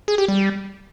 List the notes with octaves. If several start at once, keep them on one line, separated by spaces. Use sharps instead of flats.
G#4
G4
G3